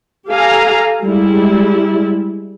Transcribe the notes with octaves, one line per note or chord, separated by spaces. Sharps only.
G4 A4 F5 G#5 A#5
G3 G#3 E4